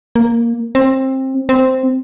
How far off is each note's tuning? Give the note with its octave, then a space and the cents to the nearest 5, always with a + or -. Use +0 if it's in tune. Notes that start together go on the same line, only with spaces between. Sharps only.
A#3 +0
C4 +20
C4 -5